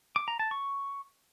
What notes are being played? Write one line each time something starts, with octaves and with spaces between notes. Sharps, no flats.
D6
A#5
A5
C#6